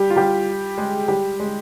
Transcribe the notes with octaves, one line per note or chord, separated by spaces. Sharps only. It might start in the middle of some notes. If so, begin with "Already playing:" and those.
Already playing: G3 G4
F4
G3 G4
G#3 G#4
G3 G4
G#3 G#4